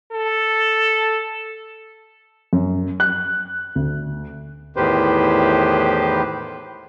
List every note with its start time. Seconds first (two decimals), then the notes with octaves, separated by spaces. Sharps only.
0.12 A4
2.53 F#2
3.00 F#6
3.75 D2
4.76 E2 A2 D#3 G4 B4 C5